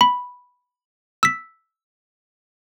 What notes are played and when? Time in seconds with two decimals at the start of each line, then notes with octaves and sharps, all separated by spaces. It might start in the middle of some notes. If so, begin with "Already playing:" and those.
0.01 B5
1.23 E6 B6